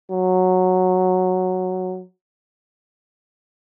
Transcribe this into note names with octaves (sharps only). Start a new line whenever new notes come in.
F#3